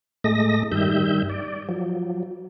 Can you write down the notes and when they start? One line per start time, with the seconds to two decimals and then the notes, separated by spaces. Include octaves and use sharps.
0.24 A2 G#3 A3 D#5 A#6
0.72 G2 D#3 G3 E5 G6
1.30 D5
1.69 F3 F#3